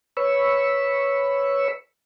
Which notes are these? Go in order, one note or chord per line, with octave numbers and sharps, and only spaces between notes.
B4 C#5 B5 C#6 E6